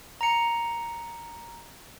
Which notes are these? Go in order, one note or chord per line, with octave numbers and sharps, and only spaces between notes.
A#5 C#7